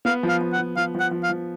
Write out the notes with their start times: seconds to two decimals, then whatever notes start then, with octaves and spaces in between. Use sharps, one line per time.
0.05 B3 F5
0.23 F3
0.29 F5
0.41 F3
0.53 F#5
0.58 F3
0.76 F3 F5
0.95 F3
1.00 F#5
1.11 F3
1.24 F5
1.29 F3